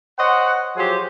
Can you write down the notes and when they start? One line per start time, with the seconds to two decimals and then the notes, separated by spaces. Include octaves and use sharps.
0.19 C5 C#5 D#5 F#5
0.77 F3 F#3 G4 G#4 C5